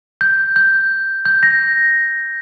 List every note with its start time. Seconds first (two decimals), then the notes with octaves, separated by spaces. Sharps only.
0.21 G6
0.56 G6
1.25 G6
1.43 A#6